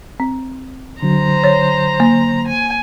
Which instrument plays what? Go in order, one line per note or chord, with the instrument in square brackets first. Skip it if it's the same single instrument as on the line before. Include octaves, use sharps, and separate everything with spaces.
[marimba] C4
[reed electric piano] D3 F#3 [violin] C5 A#5
[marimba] C#5 A6
A#3
[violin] G#5